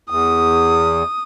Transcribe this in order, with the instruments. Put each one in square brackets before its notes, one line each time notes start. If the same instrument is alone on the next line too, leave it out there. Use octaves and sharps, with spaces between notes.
[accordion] E2 [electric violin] D#6